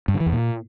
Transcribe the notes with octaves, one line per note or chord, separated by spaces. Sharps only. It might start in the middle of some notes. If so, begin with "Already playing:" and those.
G2
D3
E3
E2
A#2